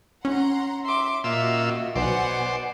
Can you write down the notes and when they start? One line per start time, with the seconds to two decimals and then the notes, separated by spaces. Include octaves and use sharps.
0.25 C#4 F#5 A#5 C6
0.84 E5 C6 D6
1.24 A#2 F4 F#4 D#5 E5 E6
1.95 B1 B2 B3 C5 D5 F#5 G#5